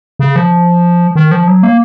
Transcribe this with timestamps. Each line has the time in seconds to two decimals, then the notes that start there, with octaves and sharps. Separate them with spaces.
0.19 C#3
0.36 F3
1.15 D#3
1.31 F3
1.48 F#3
1.63 A#3